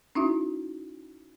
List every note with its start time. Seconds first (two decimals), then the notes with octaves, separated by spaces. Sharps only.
0.15 C#4 D#4 E4 F#4 E5